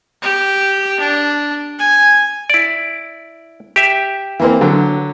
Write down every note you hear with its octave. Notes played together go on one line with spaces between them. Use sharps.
G4
D4
G#5
E4 D5
G4 E5
E3 A#3 C4
D3 F#3